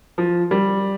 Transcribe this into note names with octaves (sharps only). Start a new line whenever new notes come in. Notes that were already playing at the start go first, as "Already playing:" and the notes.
F3
G3